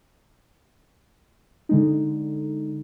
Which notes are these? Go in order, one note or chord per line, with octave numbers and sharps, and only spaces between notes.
D3 G#3 D#4